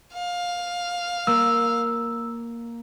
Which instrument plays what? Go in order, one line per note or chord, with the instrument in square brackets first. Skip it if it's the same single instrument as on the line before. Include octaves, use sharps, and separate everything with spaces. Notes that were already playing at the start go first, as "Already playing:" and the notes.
[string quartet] F5
[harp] A#3 [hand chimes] E6